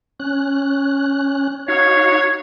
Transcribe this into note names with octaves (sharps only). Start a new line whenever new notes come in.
C#4 F#6
D#4 F#4 C#5 F5